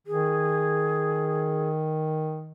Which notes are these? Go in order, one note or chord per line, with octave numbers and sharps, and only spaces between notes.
D#3 G#4